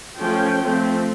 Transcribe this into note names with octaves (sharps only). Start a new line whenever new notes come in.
F3 A3 C#4 G5
F3 A3 C4